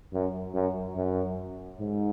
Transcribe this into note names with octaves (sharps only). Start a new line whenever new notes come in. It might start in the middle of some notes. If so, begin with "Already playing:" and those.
F#2
F#2
F#2
G#2